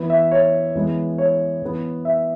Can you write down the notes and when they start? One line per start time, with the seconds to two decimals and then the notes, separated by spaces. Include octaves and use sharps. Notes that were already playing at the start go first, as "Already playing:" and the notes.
Already playing: E3 B3
0.10 E5
0.31 C#5
0.75 E3 G#3 B3
1.18 C#5
1.62 E3 B3
2.05 E5